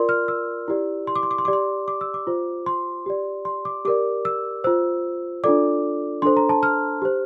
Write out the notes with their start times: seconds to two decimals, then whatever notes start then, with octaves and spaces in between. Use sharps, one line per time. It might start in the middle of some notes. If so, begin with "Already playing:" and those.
Already playing: F4 A#4 D5 C6
0.09 F6
0.28 E6
0.68 E4 G4 D5
1.07 C6
1.16 D6
1.23 C6
1.31 D6
1.38 C6
1.45 D6
1.48 G4 D5
1.53 C6
1.88 D6
2.01 E6
2.14 D6
2.27 F4 C5
2.66 C6
3.06 G4 D5
3.45 C6
3.65 D6
3.85 G4 A#4 D5 D6
4.25 E6
4.64 F4 C5 E6
5.44 D4 F4 A4 D5 D6
6.22 D4 A4 C5 C6
6.37 A#5
6.49 A5
6.63 F6
7.02 G4 C5